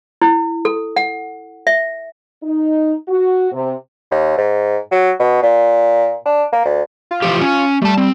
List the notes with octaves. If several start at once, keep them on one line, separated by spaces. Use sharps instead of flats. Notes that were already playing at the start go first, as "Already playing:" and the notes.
E4
A4
F#5
E5
D#4
F#4
C3
D#2
G#2
F#3
B2
A#2
D4
A#3
D2
F4
E3 F3 G4
C#4
G3 A3 A5
C4